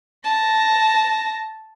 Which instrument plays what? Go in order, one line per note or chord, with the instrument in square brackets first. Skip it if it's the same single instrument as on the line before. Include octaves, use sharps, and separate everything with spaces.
[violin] A5 A#6